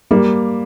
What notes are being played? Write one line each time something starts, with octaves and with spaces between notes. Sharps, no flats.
G3 A#3